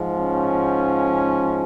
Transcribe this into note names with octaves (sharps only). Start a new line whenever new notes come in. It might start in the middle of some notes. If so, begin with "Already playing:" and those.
Already playing: G#2 F3
C#4